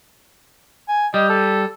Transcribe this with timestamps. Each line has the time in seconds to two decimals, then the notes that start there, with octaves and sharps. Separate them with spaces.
0.88 G#5
1.14 G3 D#5
1.29 A4